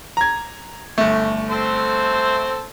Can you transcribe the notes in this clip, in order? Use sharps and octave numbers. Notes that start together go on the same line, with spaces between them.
A#5 G#6
G1 A3
C4 A4 C5